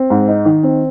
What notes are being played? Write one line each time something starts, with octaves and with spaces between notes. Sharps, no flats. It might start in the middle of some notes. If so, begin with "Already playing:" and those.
Already playing: C4
G#2
D#4
D#3
C4